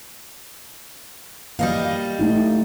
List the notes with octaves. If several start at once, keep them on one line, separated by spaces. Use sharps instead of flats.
G3 A#3 D#5 F5
A3 D#4 E4